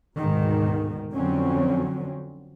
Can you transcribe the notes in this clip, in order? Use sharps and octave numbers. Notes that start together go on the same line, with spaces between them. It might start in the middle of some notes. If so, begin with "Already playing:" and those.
D2 G#2 B2 D#3
F2 D3 F#3 C4 C#4